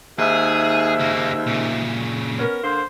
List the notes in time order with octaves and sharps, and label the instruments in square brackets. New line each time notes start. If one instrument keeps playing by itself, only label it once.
[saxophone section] D#2 G#2 E5 [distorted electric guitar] G#4
[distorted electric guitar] C#3 A#3
A#2 C#3
[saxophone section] B3 C#4 A#4
D3 A#3 C5